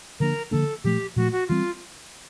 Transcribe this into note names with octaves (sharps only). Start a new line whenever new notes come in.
D3 F3 A#3 D4 A#4
D3 F3 A#3 D4 A4
A#2 F3 A3 G4
A#2 F3 A3 F#4
F#4
E3 G3 C4 F4